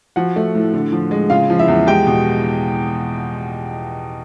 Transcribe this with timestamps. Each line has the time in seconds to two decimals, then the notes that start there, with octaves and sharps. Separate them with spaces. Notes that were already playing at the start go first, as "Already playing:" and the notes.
0.16 F3 F#4 F#5
0.36 A3
0.55 A2
0.74 D3
0.92 F3
1.11 G#3
1.30 C#3 F4 F5
1.50 F3
1.59 E4 E5
1.68 E2
1.87 G#3 G4 G5
2.07 B2